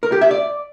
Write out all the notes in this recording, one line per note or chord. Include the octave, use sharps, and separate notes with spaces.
A#4
G4
E5
D5